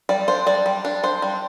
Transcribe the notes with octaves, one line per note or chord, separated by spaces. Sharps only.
G3 D5
D4 C5
G3 D5
G3
D4
D4 C5
G3